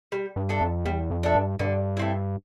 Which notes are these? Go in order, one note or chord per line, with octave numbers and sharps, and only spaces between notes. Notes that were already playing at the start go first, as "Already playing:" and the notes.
G3
G2
D4 A4 E5
F2
E2 G3
F2
D4 A4 E5
G2
G2 D3
A3 C4 E4